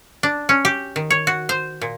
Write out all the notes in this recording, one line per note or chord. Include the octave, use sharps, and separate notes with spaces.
D4
C#4
G4
D#3
C#5
F#4
C5
A#2